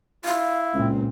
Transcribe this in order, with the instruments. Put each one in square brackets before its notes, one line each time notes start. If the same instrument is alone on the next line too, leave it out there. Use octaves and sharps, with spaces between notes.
[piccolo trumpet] E4 [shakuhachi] F5
[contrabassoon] C#2 [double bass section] A#2 C4